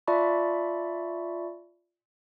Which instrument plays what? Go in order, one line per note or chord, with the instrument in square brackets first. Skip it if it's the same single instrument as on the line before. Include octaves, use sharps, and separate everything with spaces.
[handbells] F4 D5 E5 A5 B5 C#6